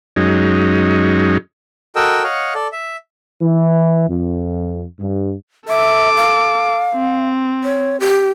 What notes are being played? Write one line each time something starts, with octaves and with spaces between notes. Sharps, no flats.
F#2 F#3 G#3 C#4 D#4
F#4 A4 A#4 D#5 G5 E6
C#5 D#5 F5 F#5
A4 D5
E5
E3
F2
G2
A4 E5 D6
F5
C4
C#5
G4